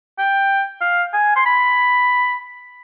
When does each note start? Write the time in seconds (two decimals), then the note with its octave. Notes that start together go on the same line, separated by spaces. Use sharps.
0.19 G5
0.81 F5
1.13 G#5
1.36 C6
1.46 B5